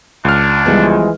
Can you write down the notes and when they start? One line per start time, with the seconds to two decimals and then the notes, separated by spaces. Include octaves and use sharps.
0.25 C#2 D4 F6
0.66 E3 F3 G3 G#3 B3